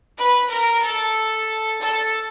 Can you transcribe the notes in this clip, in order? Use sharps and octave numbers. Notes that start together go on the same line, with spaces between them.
B4
A#4
A4
A4